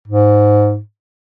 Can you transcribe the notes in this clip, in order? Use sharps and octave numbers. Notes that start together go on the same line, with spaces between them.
G#2